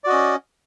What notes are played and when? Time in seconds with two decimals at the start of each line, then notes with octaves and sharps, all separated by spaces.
0.04 D5
0.07 F#4
0.09 D#5
0.12 C#4